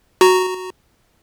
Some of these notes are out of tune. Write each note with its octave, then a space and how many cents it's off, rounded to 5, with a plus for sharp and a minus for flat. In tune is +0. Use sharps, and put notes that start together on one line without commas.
F#4 +0 A#5 +0